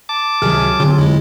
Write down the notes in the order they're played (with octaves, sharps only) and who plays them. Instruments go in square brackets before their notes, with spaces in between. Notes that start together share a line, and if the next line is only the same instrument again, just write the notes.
[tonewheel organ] A5 D6
[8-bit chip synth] C#2 C3 D#3 [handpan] F#3 G#4 [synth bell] F6
[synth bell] D3 [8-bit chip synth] F4
[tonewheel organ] F2 [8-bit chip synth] G#3 E4